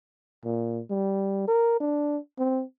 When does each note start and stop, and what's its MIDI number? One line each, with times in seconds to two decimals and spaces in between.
0.45 0.81 46
0.90 1.44 55
1.48 1.77 70
1.80 2.18 62
2.38 2.63 60